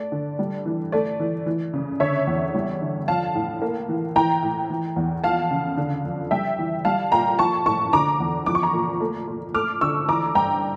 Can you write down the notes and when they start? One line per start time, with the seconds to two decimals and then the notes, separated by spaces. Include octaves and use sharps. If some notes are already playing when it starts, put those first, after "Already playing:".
Already playing: A3 D5
0.12 D3
0.39 G3
0.66 E3
0.92 A3 D5
1.20 E3
1.46 E3
1.74 C#3
2.00 D3 C#5 E5
2.27 E2
2.55 G3
2.82 D3
3.08 F3 F5 A5
3.35 A2
3.62 A#3
3.89 E3
4.16 E3 G5 A#5
4.43 A2
4.70 E3
4.96 E2
5.23 F3 F5 A5
5.51 C#3
5.77 D3
6.05 F2
6.31 G3 E5 G5
6.58 E3
6.85 G3 F5 A5
7.12 A#2 G5 A#5
7.39 F3 A5 C#6
7.66 A2 A5 C#6
7.93 D3 A#5 D6
8.20 E2
8.46 F3 D6
8.55 C#6
8.63 A#5 D6
8.73 A#2
9.00 A3
9.28 A#2
9.54 A3 D6 F6
9.81 D3 C#6 E6
10.08 E3 A#5 D6
10.35 G2 G5 A#5